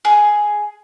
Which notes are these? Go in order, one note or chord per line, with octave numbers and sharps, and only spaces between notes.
G#4